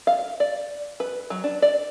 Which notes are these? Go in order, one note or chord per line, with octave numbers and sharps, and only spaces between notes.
F5
D5
B4
F#3
D4
D5